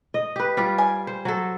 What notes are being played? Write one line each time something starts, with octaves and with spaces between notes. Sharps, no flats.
D#5
G4 B4
G3 F4 D5
G#5
C5
F#3 A4